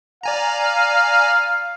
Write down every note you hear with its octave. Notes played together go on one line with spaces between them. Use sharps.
D5 F5 G#5 A#5